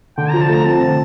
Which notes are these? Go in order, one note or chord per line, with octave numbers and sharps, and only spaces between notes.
D3 G5
F3 A#5
A5
A3 A#5
C4 A5
D3